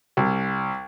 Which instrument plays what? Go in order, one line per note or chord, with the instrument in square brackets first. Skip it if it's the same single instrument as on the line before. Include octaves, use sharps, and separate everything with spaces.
[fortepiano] C2